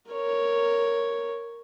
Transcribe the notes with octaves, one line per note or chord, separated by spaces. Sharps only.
A#4 C#5